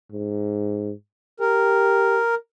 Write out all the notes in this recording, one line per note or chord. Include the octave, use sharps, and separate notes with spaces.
G#2
G4 A#4